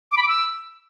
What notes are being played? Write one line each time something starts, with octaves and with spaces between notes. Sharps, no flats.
D6
B5
D6
E6